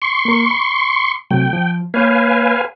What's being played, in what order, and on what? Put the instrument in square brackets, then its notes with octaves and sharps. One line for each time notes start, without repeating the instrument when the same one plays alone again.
[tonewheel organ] C6 C#6
[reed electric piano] A#3 A#4
B5
[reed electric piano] C3 F#3 A3 [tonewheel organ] G5
[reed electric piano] F3
[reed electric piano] A#3 C#5 G6 [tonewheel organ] B4 F5 G#5